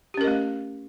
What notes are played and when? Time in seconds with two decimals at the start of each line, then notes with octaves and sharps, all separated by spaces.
0.14 G4
0.17 C#4
0.21 A#4
0.24 D#5
0.27 A3